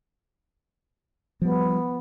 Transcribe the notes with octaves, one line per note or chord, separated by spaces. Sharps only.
F3 G3 B3